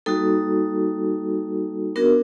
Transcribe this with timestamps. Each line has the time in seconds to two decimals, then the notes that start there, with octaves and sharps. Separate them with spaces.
0.06 G3 A#3 D#4 F#4 A4
1.96 B3 D4 F#4 A#4